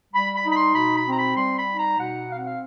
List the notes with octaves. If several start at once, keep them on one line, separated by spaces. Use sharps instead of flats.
G3 B5
B5
D#4
B5
C6
B2 B5
B5
C4 A#5
B5
G3 C6
B5
D#4
A#5
B2 F#5
C4 F5
F#5
F5